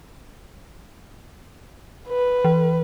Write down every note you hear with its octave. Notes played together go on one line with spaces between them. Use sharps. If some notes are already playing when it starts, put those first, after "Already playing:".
B4
E3